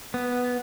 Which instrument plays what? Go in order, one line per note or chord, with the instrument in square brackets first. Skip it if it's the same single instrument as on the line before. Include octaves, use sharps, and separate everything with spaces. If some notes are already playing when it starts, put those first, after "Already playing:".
[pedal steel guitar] B3